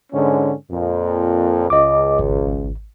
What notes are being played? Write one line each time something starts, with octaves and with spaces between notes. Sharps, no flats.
G#2 D3 C#4
F2 A#2
C#2 D#5 D6
G#1